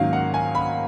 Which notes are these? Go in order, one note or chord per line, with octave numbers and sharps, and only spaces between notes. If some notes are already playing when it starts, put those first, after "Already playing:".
Already playing: G#2 D#3 F#3 A#3 C#4 F5
F#5
G#5
B5